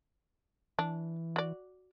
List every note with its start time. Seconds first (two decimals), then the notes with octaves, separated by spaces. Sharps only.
0.79 E3 D4
1.36 F#4 D5